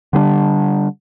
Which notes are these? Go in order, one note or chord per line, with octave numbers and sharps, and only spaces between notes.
D3 G3 C4 D4